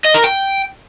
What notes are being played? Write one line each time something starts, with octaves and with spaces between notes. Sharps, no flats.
D#5
A#4
G5